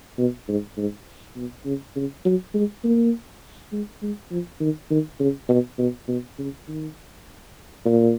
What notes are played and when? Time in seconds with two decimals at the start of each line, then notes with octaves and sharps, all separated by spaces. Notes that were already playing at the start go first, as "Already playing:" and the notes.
0.18 B2
0.49 G#2
0.78 G#2
1.36 B2
1.66 C#3
1.96 C#3
2.25 F#3
2.55 G#3
2.84 A#3
3.72 G#3
4.03 G#3
4.31 F3
4.61 D#3
4.91 D#3
5.20 C#3
5.49 B2
5.79 B2
6.08 B2
6.38 C#3
6.68 D#3
7.85 A#2